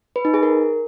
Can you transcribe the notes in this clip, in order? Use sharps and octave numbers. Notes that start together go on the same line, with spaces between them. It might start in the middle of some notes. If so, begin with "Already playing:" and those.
B4
D#4
G#4
A#4